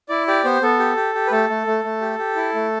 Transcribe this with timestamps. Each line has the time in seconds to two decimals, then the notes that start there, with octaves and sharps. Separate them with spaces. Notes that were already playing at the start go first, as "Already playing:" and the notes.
0.09 E4 D5
0.27 G4 D5
0.44 B3 C5
0.61 B3 A4
0.79 G4
0.97 G4
1.15 G4
1.27 B4
1.31 A3 A4
1.50 A3
1.67 A3
1.84 A3
2.01 G4
2.19 G4
2.36 E4
2.54 A3